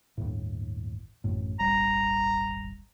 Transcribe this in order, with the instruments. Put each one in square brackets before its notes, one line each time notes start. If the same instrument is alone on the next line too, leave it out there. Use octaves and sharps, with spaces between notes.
[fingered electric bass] G1 D#2 A2
A1 F#2 A2
[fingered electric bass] D#1 G#1 G3 [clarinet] A#5